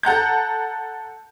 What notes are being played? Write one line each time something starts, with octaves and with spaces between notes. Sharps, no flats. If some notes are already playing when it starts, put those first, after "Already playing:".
A4 F#5 A#5 G6